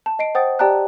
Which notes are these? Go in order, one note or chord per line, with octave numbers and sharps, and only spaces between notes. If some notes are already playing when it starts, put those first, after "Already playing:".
A5
D#5 C7 D7
C5 F#5 G5 D#6 A6
G4 D5 G5 A5 A#5 F#6